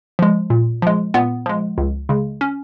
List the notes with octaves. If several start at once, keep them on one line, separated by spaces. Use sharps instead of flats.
F3 G#3
A#2
F3 G#3
A#2 B3
F3 G#3
C#2
C#3 G#3
C#4